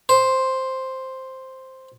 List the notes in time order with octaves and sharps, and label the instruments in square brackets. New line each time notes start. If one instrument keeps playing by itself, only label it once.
[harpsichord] C5